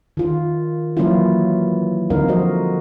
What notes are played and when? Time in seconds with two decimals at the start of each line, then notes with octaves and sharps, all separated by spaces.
0.17 D#3 F4
0.97 E3 F#3 A#3 C#4 E4 F4
2.10 D3 G3 C4 D#4 A#4 F5
2.28 F3 F#4 C5 D#5